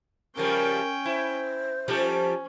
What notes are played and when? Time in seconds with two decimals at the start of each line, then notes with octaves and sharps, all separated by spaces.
0.37 C#3 F3 G3 C#4 A#4 G5
1.05 E4 C5
1.88 F3 G3 C#4 G4 A4